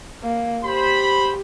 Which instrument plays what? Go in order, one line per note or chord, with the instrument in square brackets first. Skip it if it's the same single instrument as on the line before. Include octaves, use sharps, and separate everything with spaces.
[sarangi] A#3
[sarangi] G4 [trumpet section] C5 B5